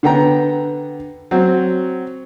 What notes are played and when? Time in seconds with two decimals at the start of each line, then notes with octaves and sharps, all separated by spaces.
0.03 D3 B3 G5 A#5
1.31 F#3 C4